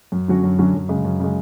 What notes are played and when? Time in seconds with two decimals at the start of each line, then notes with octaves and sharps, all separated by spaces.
0.12 F#2
0.28 D3 F#3 C#4 F#4
0.44 F#2
0.59 D3 F#3 C#4 F#4
0.74 F#2
0.89 C#3 G#3
1.05 F#2
1.20 C#3 G#3